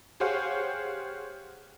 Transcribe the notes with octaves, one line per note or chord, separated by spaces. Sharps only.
G4 G#4 C5 C#5 F5 F#5